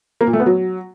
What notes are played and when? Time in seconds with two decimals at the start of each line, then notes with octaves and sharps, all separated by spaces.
0.21 A#3
0.27 A#2
0.33 A3
0.40 B3
0.46 F#3